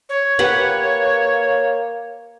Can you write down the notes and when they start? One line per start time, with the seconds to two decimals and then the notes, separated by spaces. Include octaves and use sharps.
0.09 C#5
0.39 A#3 G4 B4 F#5